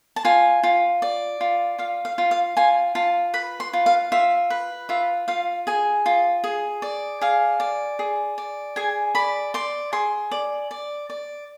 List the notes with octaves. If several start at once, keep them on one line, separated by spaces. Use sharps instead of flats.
A5
F4 G#5
F4
D5
F4
F4 F5
F5
F4
F5
F4 G#5
F4 A5
B4 B5
C6
F4
F5
F4 E5
B4
F4 E5
F4 F5
G#4 G#5
F4
G#4
D5
G#4 F5
D5
G#4
D5
G#4 G#5
D5 B5
D5 C6
G#4 C6
D5
D5
D5